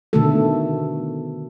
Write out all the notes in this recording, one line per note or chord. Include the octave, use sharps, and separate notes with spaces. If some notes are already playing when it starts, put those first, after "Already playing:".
B2 D3 D#3 A3 F#4 A4